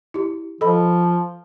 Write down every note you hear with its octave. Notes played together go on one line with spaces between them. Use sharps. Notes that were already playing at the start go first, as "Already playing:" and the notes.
E4 G4
F3 A4 D#5 B5